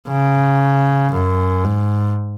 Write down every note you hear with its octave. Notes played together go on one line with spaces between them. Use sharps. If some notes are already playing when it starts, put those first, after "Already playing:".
C#3
F#2
G#2